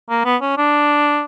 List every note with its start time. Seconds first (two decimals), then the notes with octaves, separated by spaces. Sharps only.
0.10 A#3
0.25 B3
0.41 C#4
0.58 D4